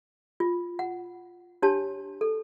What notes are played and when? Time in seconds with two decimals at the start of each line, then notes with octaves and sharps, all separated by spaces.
0.40 F4
0.79 F#5
1.62 D4 G4 C#5 A5
2.21 A4